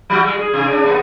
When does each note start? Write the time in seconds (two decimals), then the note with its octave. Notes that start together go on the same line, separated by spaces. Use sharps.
0.10 F#3 F#4
0.24 G3 G#3
0.39 G#4
0.53 C3 G#4
0.68 C#4 D4
0.84 B2 A#3 B3